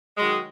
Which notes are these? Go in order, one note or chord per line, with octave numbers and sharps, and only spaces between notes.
D#3 F#3 G#3